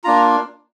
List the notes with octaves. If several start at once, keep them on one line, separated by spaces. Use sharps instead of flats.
A#3 D4 F4 A#5